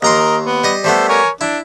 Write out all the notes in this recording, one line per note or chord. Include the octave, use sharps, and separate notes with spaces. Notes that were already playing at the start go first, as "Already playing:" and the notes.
D#2 A#4 D#5 A#5 C6
B3
G3 D#5 D#6
G3 A3 B3 A4 C5
A#4 C#5 G#5
D4 E4